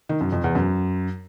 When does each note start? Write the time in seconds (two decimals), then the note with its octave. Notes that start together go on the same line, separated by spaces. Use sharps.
0.09 D#3
0.21 F#2
0.32 F2
0.44 E2
0.55 F#2